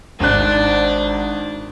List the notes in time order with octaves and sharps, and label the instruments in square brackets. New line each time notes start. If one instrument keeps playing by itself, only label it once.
[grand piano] G#1 F#6 [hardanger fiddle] D4